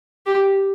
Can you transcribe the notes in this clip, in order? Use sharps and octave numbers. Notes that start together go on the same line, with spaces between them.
G4